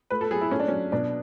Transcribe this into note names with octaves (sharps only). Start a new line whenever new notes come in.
A3 B4
A4
F#3 G#4
E4
A3 C#4
D4
F#3 C#4
B2 D4